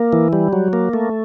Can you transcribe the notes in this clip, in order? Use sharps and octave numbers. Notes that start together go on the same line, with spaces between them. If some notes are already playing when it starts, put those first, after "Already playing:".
Already playing: A#3
E3
G3
F#3
A#3
A3